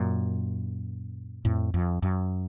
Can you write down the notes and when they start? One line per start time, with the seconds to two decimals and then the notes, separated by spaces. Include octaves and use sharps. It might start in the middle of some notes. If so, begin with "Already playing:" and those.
Already playing: F#2 A#2
1.45 F2 A2
1.74 F2
2.02 F#2